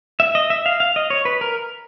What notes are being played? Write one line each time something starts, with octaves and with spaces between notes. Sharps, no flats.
E5
D#5
E5
F5
F5
D#5
C#5
B4
A#4